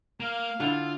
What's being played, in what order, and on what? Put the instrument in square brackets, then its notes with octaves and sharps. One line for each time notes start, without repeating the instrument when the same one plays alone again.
[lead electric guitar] A#3 [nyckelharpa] F5
[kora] D3 E4 [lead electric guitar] F4